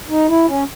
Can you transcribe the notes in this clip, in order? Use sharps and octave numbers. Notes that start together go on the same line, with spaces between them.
D#4
E4
C#4